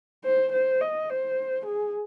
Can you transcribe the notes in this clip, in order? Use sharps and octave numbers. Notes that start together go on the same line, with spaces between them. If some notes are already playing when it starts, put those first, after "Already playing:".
C5
C5
D#5
C5
G#4